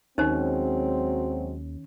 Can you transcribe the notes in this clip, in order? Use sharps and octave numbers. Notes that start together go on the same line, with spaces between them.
D#2 D#3 F#3 G#3 C4 C#4 D#4 C5